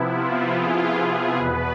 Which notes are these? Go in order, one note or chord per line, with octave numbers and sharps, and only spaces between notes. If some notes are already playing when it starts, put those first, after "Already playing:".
Already playing: C3 F3 B3 E4
F4
G#4
E2 B2 B3 B4